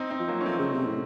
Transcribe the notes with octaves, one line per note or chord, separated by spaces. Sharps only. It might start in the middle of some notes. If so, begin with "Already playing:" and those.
Already playing: C4 D#4
C4 D#4
F3
F#3 A#3
C#4
F3 A3 C4
C#3
C3
A2